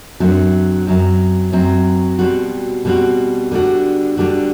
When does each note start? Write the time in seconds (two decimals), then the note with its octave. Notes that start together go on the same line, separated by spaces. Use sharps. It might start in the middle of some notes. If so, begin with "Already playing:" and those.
0.20 F#2 D3 F#3 C4
0.87 F#2 F#3 C4
1.52 F#2 F#3 C4
2.19 B2 G3 C4 F#4
2.85 B2 G3 C4 F#4
3.51 D3 G3 D4 F#4
4.17 D3 G3 D4 F#4